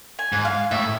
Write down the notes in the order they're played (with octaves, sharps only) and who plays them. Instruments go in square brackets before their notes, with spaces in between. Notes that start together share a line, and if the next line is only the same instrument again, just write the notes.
[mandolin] G#5
[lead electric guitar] G#2
[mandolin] F5
[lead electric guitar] A2 [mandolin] E5